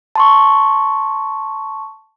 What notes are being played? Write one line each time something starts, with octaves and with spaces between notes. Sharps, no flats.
A5 C6 C#6